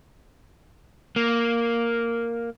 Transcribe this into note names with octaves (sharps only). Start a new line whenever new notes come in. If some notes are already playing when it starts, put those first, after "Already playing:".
A#3